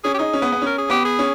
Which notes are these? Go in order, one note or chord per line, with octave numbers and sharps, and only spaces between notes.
C#4 G#4
G4
D#4 G#4
C#4
B3
B3
C#4 A#4
G#4
B3 G4
G#4
C#4